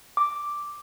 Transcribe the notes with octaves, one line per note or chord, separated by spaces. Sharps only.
D6